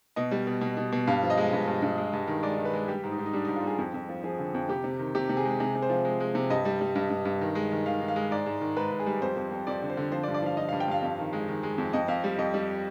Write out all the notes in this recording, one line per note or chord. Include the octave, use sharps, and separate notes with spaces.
B2 D#5
G3
B2
B2
B2
B2
G2 F5
F3
D#5
G#3
G2
G2
G2
G#3
G2
D#3
G#3 D5
D#3
B4
G#3
G3 G4
G#2
D#4
G#2
D#4
G3 D4
G#2 D#4
F4
G3 G#4
F2
F2
F3
F3 G#4
D3
F2
C3 G4
C3
D#3
C3 G4
C3
G#4
G#3
C3 G#4
C3
C5
F3
G#3
G#3
C3
G2 D#5
G3
G3
G2
G2
G2
D#3
G#3
D#3
D#3 F5
D#3
F5
G#3
G#2 D5
G#2
D#3
G#2 B4
G#2
G#4
G3
F2 C5
F2
F2
F2 D5
D3
C5
D3
F3 C5
D5
G2
D5
F3 F5
F3 D#5
G2 F5
G5
G2 F5
F2
D#3
G#3
D#3
G#3
F2
F2 D#5
F2 F5
G3
F2 D#5
G3